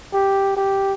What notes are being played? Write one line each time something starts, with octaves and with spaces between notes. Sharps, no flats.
G4
G4